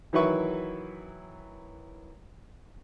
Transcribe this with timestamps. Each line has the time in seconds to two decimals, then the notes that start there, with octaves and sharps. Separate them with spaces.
0.13 D#3 E3 F#3 E4 B4 C#6